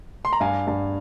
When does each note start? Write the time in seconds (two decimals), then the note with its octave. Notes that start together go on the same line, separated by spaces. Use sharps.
0.25 C6
0.33 A#5
0.40 G2 F5 G#5
0.67 G2